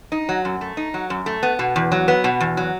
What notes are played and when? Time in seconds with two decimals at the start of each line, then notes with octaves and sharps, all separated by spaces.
0.12 D#4
0.29 F#3
0.45 F#2
0.61 A3
0.77 D#4
0.94 F#3
1.10 F#2
1.26 A3
1.43 B3
1.59 B2
1.76 E2
1.92 F#3
2.08 B3
2.24 B2
2.40 E2
2.57 F#3